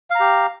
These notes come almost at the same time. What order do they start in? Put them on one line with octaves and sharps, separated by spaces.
F5 A#5 G4